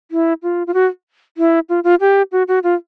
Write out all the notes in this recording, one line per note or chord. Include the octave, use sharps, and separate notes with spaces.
E4
F4
F4
F#4
E4
F4
F4
G4
F#4
F#4
F4